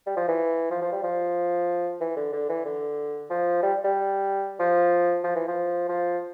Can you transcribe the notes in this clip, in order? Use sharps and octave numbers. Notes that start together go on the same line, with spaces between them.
G3
F3
E3
F3
F3
G3
F3
E3
D3
D3
E3
D3
F3
G3
G3
F3
F3
E3
F3
F3